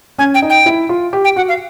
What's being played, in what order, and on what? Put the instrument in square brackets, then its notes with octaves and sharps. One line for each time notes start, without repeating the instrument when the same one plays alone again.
[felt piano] C#4 [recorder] G#5
[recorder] G5
[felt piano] D#4
[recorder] G5
[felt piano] E4
F4
G4
[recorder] G5
[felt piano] F#4 [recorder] F#5
[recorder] F5